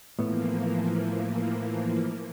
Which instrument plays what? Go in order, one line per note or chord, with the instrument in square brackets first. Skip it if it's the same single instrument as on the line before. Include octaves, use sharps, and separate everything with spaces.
[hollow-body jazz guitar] A2 B3 [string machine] E3 F3 A#3